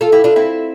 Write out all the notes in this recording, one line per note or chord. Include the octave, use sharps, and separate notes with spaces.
F4 A4
E4 G4
D4 F4
C4 E4